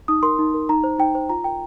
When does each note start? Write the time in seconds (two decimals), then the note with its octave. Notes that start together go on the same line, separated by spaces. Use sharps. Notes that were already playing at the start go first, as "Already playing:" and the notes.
0.08 D#4 D#6
0.23 A#4 C6
0.39 D#4
0.54 A#4
0.69 D#4 A#5
0.84 C5
0.99 D#4 G5
1.15 C5
1.29 F4 A#5
1.44 A#4 G5